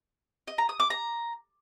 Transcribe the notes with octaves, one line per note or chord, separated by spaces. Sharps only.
D#5
A#5
D#6
D6
A#5